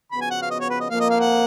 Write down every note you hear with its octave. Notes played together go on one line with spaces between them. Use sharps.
C#3 F3 B3 F#4 B5
G#5
F#5
F5
D#5
C#5
B4
D#5
F2 F3 A#3 F5
D#5
F5
F#5